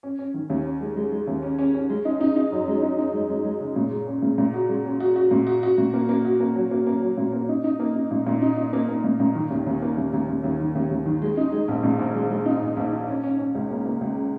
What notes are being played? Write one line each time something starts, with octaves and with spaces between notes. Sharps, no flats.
C#4
C#4
D#3
D#2
C#4
G#3
G#3
G#3
D#2
C#4
C#4
C#4
G#3
D#4
D#4
D#4
F#2
G#3
D#4
D#4
G#3
G#3
G#3
C#3
A#2
G#3
C#4
A#2
A#2
F#4
G#3
C#4
F#4
F#4
A#2
F#4
F#4
A#2
A#3
A#3
F#4
A#3
F#3
A#3
A#3
F#3
A#2
A#3
D#4
D#4
A#3
D#4
A#2
A#2
D#4
D#4
A#3
A#3
A#2
A#2
D#3
D#2
D#2
A#3
D#2
D#2
D#2
D#2
D#3
D#2
D#2
D#3
G#3
D#4
G#3
A#1
A#2
A#1
G#3
G#3
D#4
A#1
A#1
D#4
C#4
C#4
C#4
C#2
A#3
A#3
C#2